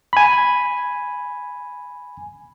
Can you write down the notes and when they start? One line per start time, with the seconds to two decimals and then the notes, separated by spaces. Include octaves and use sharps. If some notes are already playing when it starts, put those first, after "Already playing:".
0.13 G#5 B5